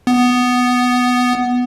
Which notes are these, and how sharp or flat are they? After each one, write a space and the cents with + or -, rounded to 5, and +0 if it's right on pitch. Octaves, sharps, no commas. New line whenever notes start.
B3 +5